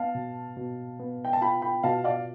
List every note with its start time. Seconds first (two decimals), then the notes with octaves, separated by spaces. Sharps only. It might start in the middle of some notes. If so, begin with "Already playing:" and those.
Already playing: B3 F5 A5
0.15 B2
0.57 B2
0.99 B3
1.25 G5
1.33 A5
1.42 F4 G5 B5
1.62 G5 B5
1.83 B2 F5 A5
2.04 D5 F5